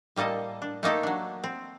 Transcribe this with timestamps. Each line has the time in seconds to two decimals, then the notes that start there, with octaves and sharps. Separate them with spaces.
0.16 A2 G3 A#3 A4 D#5
0.62 D4
0.83 A3 A#3 D#4 G4 A4
1.03 F#3 D4
1.44 C4